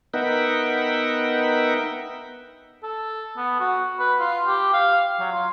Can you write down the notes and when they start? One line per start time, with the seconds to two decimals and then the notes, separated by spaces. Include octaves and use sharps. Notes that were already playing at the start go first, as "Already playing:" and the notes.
0.14 B3 D#4 A#4 E5 F#5 G5
2.83 A4
3.37 B3
3.60 F#4
3.99 B4
4.20 F4
4.46 G4
4.74 F5
5.20 F#3
5.32 F4